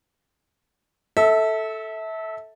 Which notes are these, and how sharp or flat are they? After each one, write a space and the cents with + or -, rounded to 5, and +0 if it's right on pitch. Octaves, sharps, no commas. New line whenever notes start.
A4 +0 E5 -25